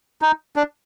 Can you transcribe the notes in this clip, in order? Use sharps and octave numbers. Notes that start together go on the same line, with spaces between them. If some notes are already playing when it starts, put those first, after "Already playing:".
D#4
D4